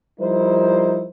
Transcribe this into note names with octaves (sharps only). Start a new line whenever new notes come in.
F3 G3 D#4 E4 A#4 C5